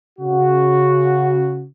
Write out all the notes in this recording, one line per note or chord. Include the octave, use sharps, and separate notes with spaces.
C#3 F#4